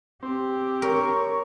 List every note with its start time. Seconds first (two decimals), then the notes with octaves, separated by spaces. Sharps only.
0.23 C4 G4
0.82 A#4 C#5 A#5 C#6